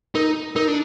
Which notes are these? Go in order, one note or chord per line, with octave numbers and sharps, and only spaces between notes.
D#4 A#4
D#4 A#4
D4